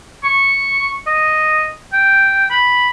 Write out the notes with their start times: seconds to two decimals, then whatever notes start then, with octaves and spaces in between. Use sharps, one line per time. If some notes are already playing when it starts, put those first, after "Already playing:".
0.24 C#6
1.07 D#5
1.93 G5
2.50 B5